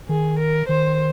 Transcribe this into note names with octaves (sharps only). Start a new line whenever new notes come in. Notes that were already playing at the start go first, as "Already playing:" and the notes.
D#3 G#4
A#4
D#3 C5